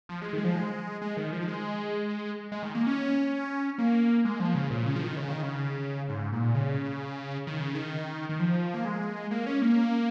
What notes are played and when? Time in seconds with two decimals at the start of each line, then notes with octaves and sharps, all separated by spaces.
0.09 F3
0.21 G#3
0.33 D#3
0.38 G#3
0.44 F3
0.55 G#3
1.02 G#3
1.17 D#3
1.33 F3
1.48 G#3
2.52 G#3
2.63 D#3
2.75 A#3
2.87 C#4
3.78 A#3
4.25 G#3
4.40 F3
4.55 C#3
4.70 A#2
4.86 C#3
4.96 F3
5.02 D#3
5.17 C#3
5.30 D#3
5.43 C#3
6.09 G#2
6.32 A#2
6.54 C#3
7.47 D#3
7.61 C#3
7.75 D#3
8.29 D#3
8.39 F3
8.74 A#3
8.85 G#3
9.31 A#3
9.46 C#4
9.62 A#3